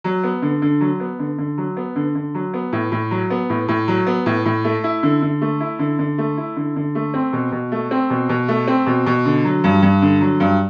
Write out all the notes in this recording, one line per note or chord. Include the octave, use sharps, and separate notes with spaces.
F#3
B3
D3
D3
F#3
B3
D3
D3
F#3
B3
D3
D3
F#3
B3
A2
A2
F#3
B3
A2
A2
F#3
B3
A2
A2
A3
E4
D3
D3
A3
E4
D3
D3
A3
E4
D3
D3
A3
C4
B2
B2
A3
C4
B2
B2
A3
C4
B2
B2
D3
F#3
G2
G2
D3
F#3
G2